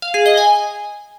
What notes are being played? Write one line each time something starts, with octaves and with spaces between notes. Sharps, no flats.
F5
G#4
D#5
G#5